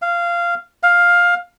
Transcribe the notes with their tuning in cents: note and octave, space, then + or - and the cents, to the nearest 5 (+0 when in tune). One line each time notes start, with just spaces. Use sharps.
F5 -15
F5 +10